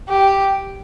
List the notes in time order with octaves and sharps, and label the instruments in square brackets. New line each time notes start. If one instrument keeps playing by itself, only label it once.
[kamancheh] G4